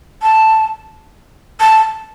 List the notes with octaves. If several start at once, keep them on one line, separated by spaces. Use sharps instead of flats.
A5
A5